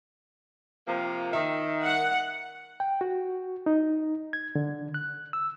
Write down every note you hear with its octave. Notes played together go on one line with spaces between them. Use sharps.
C3 F3 A#3
D#3 E5
F#5
G5
F#4
D#4
G#6
D3
F#6
E6